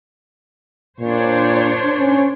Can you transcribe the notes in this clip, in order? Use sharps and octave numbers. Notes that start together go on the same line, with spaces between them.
A#2 D4 C5 C#5
C#4